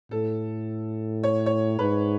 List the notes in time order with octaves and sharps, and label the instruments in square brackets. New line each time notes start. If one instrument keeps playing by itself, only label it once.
[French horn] A2 [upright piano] A4
[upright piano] C#5
C#5
[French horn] G#2 [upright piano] B4